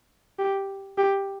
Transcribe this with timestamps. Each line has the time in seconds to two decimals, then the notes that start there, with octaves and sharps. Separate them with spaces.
0.39 G4
0.98 G4